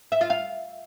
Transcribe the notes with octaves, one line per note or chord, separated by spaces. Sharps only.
E5
F4
F5